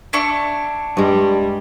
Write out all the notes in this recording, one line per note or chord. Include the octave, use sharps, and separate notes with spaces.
D4 E4 C#6
G2 G3 G#3